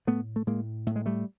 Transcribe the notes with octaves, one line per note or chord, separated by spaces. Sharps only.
A2 A3 B3
A3
A2 G#3 A#3
A2 A3
G#3
G3 A3